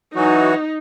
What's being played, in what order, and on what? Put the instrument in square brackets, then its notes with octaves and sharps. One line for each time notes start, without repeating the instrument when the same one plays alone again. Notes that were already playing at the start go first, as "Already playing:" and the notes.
[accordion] E3 F#3 F#4 [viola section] D#4